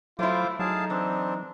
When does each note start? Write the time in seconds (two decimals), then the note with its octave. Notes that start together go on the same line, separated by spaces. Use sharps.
0.19 F#3 A3 E4 F4 C5 D6
0.59 F#3 D#4 G#4 F5 A5
0.90 E3 C4 D4